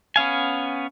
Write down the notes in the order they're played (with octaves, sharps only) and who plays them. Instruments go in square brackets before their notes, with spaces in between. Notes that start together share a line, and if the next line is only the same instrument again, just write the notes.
[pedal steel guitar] B3 C#4 F5 G#5